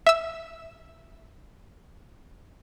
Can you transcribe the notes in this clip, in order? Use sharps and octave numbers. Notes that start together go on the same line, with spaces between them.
E5 E6